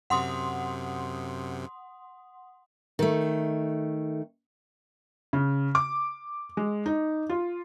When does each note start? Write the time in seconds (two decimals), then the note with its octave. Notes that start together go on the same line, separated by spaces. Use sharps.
0.10 F#2 C3 F#5 C6 D#6
2.99 D#3 A3
5.33 C#3
5.75 D6
6.57 G#3
6.86 D#4
7.29 F4